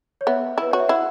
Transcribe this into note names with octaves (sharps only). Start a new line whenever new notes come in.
C#5
B3 E5
E4 B4
F#4 C#5
E5
E4 F#5